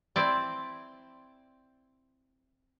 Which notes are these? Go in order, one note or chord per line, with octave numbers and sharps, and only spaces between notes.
C4 E4 D5